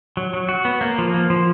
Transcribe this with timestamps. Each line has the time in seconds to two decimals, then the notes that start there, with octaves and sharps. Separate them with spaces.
0.17 F#3
0.34 F#3
0.49 F#4
0.65 B3
0.81 A#3
0.98 F3
1.14 A#3
1.30 F3